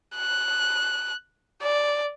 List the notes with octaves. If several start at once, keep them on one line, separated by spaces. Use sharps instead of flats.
F#6
D5